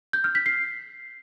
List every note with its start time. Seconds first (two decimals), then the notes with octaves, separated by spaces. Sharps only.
0.13 G6
0.24 F6
0.35 B6
0.46 C7